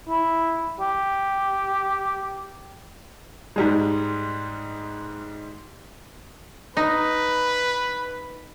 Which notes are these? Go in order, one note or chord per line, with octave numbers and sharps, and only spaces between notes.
E4
G4
G#2 G3 G#3
D#4 B4